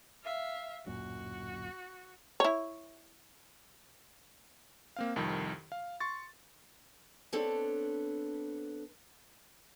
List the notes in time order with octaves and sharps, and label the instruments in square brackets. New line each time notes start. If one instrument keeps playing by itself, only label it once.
[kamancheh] E5 F5
[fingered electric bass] D1 F#2 A#2 [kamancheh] F#4
[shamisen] E4 C#5
[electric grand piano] A#3 C4 F5
C2 F2 D#3
F5
C6 C#6 A6
[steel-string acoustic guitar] B3 C4 D4 A4 C#5